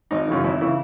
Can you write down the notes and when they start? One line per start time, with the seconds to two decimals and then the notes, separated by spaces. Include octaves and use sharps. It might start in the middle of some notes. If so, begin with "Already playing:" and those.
0.11 G#1 D#4
0.28 F#2 C#3 E3
0.44 G#1 E4
0.61 C#3 E3 E4